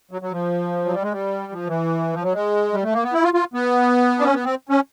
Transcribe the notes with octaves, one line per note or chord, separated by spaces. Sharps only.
F#3
F#3
F3
F#3
G3
G#3
G3
F3
E3
F3
F#3
G#3
G3
A3
A#3
B3
E4
F4
F4
B3
D4
C#4
B3
C4
C#4